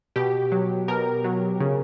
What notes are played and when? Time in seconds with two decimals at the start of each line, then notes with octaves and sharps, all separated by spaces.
0.16 B2 G4
0.52 F#3
0.88 B2 A#4
1.24 F#3
1.60 C#3